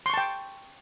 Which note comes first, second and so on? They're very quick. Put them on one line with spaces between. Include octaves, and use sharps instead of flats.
C6 C#6 A5 G5